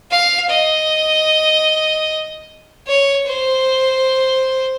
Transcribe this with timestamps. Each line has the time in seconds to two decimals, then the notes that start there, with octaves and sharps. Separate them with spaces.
0.11 F5
0.50 D#5
2.87 C#5
3.27 C5